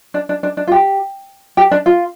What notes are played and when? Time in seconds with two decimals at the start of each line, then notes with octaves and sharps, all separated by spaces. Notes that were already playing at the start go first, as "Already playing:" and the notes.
0.14 D4
0.29 D4
0.43 D4
0.57 D4
0.67 F4
0.72 G4
1.57 G4
1.71 D4
1.86 F4